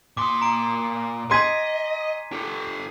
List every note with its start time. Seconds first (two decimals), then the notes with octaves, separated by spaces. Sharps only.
0.17 A#2 C6 D6 D#6
0.42 A#5 D7
1.31 D#5 G#5 C6 G#6 B6 D#7
2.32 G4 A4